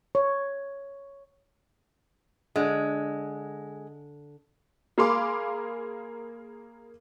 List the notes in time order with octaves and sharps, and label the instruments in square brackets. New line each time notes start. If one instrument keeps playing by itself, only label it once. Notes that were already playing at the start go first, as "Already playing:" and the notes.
[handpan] C#5
[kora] D3 [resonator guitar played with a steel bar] G#3
[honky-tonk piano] A#3 G#4 F5 B5 C6 D6